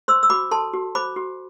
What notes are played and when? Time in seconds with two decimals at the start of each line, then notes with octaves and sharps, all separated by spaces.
0.08 C5 C6 E6
0.23 E6
0.30 F#4 B5 D6
0.51 A4 A5 C6
0.73 F#4
0.95 C5 B5 D6
1.16 F#4